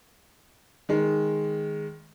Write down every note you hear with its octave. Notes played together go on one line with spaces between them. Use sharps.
D#3 G#3